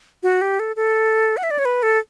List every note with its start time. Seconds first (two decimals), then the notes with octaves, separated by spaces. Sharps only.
0.23 F#4
0.42 G4
0.59 A4
0.76 A4
1.37 F#5
1.43 E5
1.51 D5
1.59 C#5
1.65 B4
1.83 A4